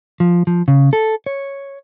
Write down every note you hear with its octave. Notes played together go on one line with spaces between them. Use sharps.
F3
F3
C#3
A4
C#5